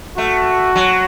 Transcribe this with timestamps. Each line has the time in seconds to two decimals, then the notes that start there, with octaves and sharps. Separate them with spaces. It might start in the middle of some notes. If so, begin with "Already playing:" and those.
0.17 A3 F#4
0.75 F#3